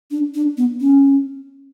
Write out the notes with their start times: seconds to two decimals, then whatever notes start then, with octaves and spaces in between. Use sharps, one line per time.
0.11 D4
0.34 D4
0.57 B3
0.80 C#4